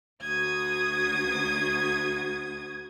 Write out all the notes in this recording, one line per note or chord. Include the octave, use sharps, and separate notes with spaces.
D2 F#4 D#6 G#6